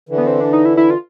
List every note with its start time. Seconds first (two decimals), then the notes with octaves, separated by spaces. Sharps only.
0.09 D3 E3
0.18 B3
0.27 C4
0.40 D4
0.53 D#4
0.65 E4
0.77 E4
0.90 F4